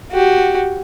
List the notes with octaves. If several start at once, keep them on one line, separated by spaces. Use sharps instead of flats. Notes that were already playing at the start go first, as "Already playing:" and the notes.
F#4 G4